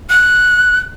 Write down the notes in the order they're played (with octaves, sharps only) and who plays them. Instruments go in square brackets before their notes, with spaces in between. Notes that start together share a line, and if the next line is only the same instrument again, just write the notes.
[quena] F#6